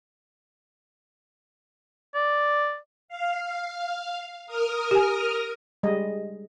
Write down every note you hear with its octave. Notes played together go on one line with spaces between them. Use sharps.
D5
F5
A#4 D#6 F6
G4 G#5
G3 G#3 D#5